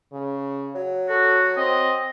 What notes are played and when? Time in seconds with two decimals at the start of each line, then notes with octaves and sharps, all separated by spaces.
0.12 C#3
0.75 F#3
1.09 F#4 A4
1.57 C4 D#5